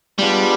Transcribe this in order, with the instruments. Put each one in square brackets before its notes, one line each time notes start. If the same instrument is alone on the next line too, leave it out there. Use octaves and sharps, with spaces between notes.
[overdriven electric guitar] G3 [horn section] G#3 B3 D4 F4